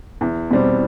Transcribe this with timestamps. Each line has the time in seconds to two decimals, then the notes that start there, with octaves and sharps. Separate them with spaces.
0.21 E2
0.51 B2 G3 C4